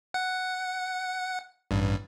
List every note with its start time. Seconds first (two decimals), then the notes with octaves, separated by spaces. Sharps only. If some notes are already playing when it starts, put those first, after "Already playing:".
0.14 F#5
1.71 A1 G2